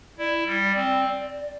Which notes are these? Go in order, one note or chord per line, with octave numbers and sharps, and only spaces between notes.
E4 D5
G3
C4